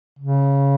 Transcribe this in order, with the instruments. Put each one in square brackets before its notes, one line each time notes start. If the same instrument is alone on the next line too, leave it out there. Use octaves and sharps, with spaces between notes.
[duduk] C#3